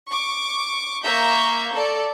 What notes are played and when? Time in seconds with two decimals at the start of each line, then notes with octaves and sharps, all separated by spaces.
0.10 C#6 D6
1.04 A#3 E5 A#5 C#6 G6
1.74 A4 D5